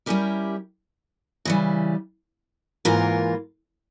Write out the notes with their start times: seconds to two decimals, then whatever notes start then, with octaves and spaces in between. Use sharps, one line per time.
0.06 G3 C#4 E4 G4 A#4
1.45 C#3 E3 G3
2.85 G#2 E3 A#3 F4 A#4